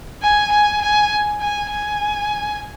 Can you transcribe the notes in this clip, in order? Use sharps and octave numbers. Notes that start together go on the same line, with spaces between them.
G#5
G#5
G#5
G#5
G#5